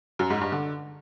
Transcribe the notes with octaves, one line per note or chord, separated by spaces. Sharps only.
F#2
G#2
G2
D3